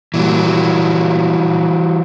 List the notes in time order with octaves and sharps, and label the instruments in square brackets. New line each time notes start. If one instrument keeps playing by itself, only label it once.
[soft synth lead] A#2 [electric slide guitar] E3 F#3 G3